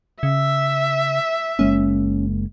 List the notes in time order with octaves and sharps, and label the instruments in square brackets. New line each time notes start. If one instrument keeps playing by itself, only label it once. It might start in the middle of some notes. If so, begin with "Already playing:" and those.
[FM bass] C#3 [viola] E5
[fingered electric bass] F#1 G#3 A#3 [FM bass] C#4